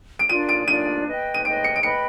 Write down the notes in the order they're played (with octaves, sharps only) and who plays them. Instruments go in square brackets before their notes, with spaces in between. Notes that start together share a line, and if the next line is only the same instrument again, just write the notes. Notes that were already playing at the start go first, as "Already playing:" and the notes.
[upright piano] D7
[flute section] D4 F4 A#4 D5 [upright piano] D#7
[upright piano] D7
[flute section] D4 F4 A#4 D5 [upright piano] D#7
[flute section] B4 D#5 G5
[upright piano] D#7
[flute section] B4 D#5 G5 [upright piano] D7
[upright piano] C#7
D7
[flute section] B4 D#5 G5 B5 [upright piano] C#7